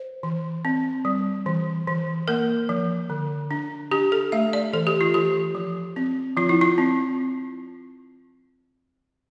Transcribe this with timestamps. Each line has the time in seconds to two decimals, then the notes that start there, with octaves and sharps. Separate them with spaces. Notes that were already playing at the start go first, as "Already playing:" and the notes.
Already playing: C5
0.23 E3
0.65 C4
1.05 G3
1.46 E3
1.87 E3
2.28 A#3 A#4
2.69 F3
3.10 D3
3.51 D4
3.91 D4 G4
4.12 A4
4.32 A3 E5
4.53 D5
4.73 E3 A4
4.87 G4
5.01 F4
5.14 E3 G4
5.55 F3
5.96 C4
6.37 F3 F4
6.49 E4
6.61 F4
6.78 C4